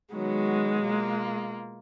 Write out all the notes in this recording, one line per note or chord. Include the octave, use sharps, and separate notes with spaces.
D#3 F#3 G#3 B3 F#4
B2 A#3 F4